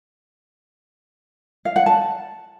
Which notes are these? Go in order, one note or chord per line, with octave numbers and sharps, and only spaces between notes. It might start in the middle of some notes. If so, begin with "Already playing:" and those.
F5
F#5
A5